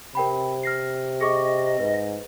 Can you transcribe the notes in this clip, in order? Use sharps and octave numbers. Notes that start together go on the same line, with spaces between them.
C3 A#4 G5 B5
F6 A#6 C7
G#4 D#5 C#6 D6
G#2 B4